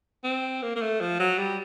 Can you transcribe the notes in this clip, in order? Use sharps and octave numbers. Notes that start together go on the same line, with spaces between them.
C4
A#3
A#3
A3
F3
F#3
G3